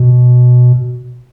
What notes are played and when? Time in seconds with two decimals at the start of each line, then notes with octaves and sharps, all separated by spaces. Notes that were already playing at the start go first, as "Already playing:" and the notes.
Already playing: B2